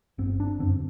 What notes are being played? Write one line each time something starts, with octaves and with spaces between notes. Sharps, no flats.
G1 C4
D4
F#2 D3 C4